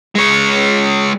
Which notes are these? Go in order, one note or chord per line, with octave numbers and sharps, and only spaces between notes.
G#3 C#5